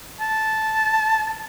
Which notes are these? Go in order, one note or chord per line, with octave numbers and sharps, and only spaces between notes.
A5